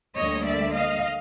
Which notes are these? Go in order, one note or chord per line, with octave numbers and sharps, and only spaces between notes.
D2 D3 G3 A#3 C#5 D#5
D5 E5
D#5 F5